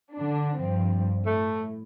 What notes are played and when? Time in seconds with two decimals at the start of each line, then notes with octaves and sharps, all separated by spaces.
0.15 D3 D4
0.57 G2 F3 C4
1.26 A2 A3